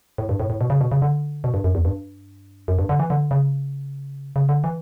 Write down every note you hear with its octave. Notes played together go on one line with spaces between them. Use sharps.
A2
G2
A2
A2
B2
C#3
B2
C#3
D3
B2
G2
F#2
E2
G2
F#2
G2
D3
E3
D3
C#3
C#3
D3
E3